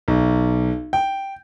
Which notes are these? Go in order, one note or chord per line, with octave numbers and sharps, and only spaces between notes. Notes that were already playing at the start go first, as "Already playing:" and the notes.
B1
G5